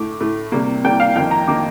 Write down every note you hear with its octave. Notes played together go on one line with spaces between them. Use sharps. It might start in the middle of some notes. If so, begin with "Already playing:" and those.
Already playing: A2 A3 D6
A2 A3
C3 G3 A#3
C3 G3 A#3 G5
F5
F2 D#3 A#3 G5
A#5
D#3 A#3 D6